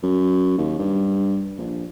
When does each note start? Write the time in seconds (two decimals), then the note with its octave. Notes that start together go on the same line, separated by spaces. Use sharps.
0.03 F#2
0.58 D#2
0.78 G2
1.59 A#1